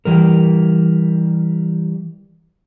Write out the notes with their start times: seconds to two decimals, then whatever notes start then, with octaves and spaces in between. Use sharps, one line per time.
0.05 E3 G3 A#4